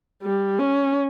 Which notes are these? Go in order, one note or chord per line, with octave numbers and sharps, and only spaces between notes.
G3
C#4